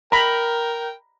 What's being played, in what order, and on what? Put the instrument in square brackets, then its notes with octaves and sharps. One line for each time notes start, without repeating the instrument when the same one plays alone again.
[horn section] A#4 G5 [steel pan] A#5 B5